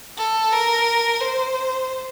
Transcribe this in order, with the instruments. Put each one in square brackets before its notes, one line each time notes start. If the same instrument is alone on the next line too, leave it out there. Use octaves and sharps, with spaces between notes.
[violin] A4
A#4
C5